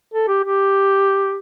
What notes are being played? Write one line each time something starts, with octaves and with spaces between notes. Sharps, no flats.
A4
G4
G4